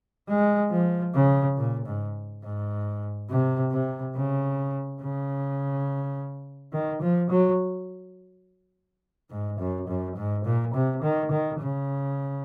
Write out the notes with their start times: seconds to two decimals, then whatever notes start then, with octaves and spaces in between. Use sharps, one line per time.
0.28 G#3
0.71 F3
1.14 C#3
1.57 A#2
1.86 G#2
2.43 G#2
3.29 C3
3.71 C3
4.14 C#3
5.01 C#3
6.72 D#3
7.01 F3
7.30 F#3
9.30 G#2
9.59 F#2
9.88 F#2
10.16 G#2
10.45 A#2
10.74 C3
11.02 D#3
11.31 D#3
11.59 C#3